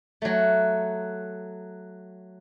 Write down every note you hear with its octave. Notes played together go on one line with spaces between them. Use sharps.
F#3 A3